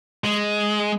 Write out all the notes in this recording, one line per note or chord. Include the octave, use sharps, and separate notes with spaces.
G#3